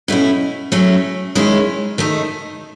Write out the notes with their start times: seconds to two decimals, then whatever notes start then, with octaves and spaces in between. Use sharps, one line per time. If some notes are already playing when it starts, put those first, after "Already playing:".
0.08 B2 A3 C#4 E4
0.72 F#3 A3 C#4 E4
1.35 D#3 G#3 C#4 E4
1.98 D#3 A3 D#4